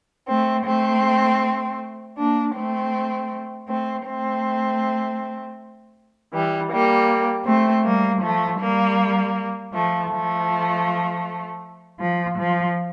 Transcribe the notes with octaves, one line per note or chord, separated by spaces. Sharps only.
A3 C4
A3 C4
A#3 D4
A3 C4
A3 C4
A3 C4
E3 G3
G3 A#3
A3 C4
G3 A#3
F3 A3
G3 A#3
F3 A3
F3 A3
F3
F3